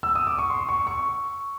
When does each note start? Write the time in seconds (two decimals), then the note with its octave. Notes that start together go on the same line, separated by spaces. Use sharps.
0.03 E6
0.15 D#6
0.27 D6
0.38 C#6
0.50 C6
0.69 C#6
0.87 C#6